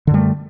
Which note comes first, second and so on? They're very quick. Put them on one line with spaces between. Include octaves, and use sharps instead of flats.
D3 F#2 G3 A3